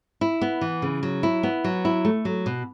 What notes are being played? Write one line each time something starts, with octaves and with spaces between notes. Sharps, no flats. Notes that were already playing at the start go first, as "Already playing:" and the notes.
E4
B3
E3
C#3
F#3
E4
B3
F#3
E4
A3
F#3
B2